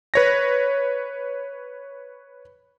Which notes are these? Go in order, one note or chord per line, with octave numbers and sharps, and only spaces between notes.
B4 C#5 A#6